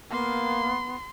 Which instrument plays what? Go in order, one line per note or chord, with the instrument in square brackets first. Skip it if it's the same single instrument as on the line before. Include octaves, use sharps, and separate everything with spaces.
[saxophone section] A#3 [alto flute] B3 [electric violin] C6